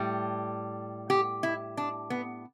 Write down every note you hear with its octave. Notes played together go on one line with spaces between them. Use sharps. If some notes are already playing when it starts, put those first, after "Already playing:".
Already playing: A2 G3
G4
E4
D4
B3